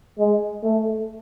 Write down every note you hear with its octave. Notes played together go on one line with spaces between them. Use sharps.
G#3
A3